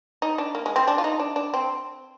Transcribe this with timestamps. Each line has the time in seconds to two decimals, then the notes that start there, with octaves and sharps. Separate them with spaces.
0.22 D#4
0.38 D4
0.55 A#3
0.66 G#3
0.76 C4
0.88 D4
0.98 F4
1.04 D#4
1.20 D4
1.36 D4
1.54 C4